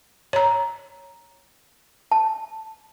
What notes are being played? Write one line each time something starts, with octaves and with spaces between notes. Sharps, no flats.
C#5 A#5
A5